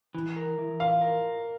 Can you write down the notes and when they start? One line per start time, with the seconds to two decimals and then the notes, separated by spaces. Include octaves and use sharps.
0.15 E3
0.36 A#4
0.58 E3
0.80 F4 F5
1.01 A#4